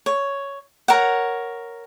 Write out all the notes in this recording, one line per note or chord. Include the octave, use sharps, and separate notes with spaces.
C#5
A#4 C#5 F#5